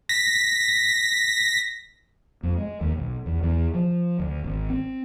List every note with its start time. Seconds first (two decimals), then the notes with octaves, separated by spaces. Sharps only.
0.09 A#6 B6
2.43 F2
2.57 G#3
2.81 D#2
2.97 B1
3.26 E2
3.43 E2
3.74 F3
4.19 D2
4.44 G#1
4.70 C4